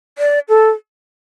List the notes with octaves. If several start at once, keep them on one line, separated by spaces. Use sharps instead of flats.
D5
A4